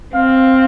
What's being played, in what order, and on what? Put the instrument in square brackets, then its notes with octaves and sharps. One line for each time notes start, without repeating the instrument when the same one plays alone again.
[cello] C4 [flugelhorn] F5